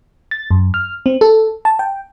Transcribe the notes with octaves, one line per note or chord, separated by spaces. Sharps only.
A6
F#2
F6
C4
A4
A5
G5